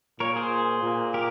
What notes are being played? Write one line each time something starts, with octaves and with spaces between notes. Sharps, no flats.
A#2 A#4 C#5
G#4 C5
A#2
G4 A#4